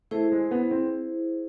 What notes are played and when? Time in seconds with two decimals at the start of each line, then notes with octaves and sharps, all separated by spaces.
0.11 A3 E4 G#4 C5
0.32 G#3
0.51 B3
0.71 C4